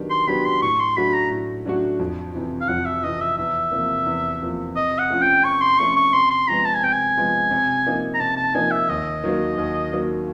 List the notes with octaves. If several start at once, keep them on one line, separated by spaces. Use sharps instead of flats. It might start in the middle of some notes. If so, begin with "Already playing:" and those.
Already playing: D#3 F#3 B3 D4 G4
C6
F#3 B3 D4 G4 B5
C6
A2 C#6
C6
F#3 A3 D4 F#4 B5
A#5
A2
F#3 A3 D4 F#4
F2
C3 E3
F5
F2 F#5
E5
C3 E3 D#5
E5
E2 E5
C3 F3 A#3
E2
C3 F3 A#3
C3 D#5
F#5
F3 A3 C#4 F4
G5
C3 C#6
C6
F3 A3 C#4 F4 C#6
C#6
C3 C6
C6
F3 G#3 B3 A#5
A5
G#5
C3 G5
G#5
F3 G#3 B3
C3
F3 A#3 D#4
A#5
C3 A5
A5
F3 A#3 D#4 G#5
E5
D#2 D#5
D#3 F#3 A#3
D#2
D#3 F#3 A#3